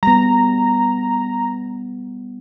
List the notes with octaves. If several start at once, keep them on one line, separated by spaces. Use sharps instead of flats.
G3 B3 A#5